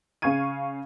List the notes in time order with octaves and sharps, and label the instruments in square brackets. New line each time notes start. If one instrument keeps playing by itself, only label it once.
[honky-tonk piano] C#3 C#4 F5 C#6 G#6 D#7